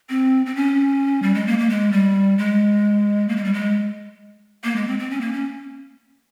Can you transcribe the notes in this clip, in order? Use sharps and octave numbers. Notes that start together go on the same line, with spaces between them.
C4
C4
C#4
G3
G#3
A#3
A#3
G#3
G3
G#3
A#3
G#3
G3
G#3
A#3
G#3
C4
C4
C#4
A#3
C#4